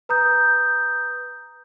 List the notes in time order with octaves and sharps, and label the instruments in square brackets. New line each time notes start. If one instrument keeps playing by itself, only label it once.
[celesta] B4 A#5 D#6 G6